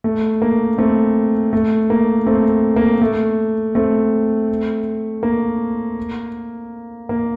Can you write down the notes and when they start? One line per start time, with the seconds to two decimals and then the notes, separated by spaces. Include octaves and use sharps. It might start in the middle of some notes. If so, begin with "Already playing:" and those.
0.04 A3
0.42 A#3
0.78 A3 C4
1.53 A3
1.90 A#3
2.26 A3 C4
2.76 A#3
3.02 A3
3.75 A3 C4
5.23 A#3
7.09 A#3